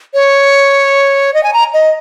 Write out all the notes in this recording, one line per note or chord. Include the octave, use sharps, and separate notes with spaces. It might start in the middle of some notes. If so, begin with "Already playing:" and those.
C#5
D#5
G#5
A#5
D#5